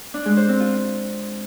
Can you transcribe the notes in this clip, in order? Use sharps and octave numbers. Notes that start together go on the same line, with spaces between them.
D4
G#3
C5
C4
F4